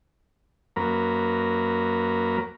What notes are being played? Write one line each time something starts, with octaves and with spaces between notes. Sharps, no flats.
F#2 A#3 A#4 B4